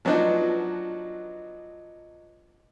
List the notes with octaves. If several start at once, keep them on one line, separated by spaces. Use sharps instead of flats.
F3 F#3 B3 D4 D#4 F#4